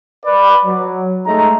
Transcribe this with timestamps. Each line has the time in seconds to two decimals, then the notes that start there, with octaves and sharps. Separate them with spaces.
0.24 B4 D5
0.65 F#3
1.26 G#3 A3 D#4 A#5